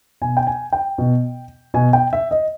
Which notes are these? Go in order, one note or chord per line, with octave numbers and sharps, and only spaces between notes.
B2 G#5
G5
G#5
G5
B2
B2 G#5
G5
E5
D#5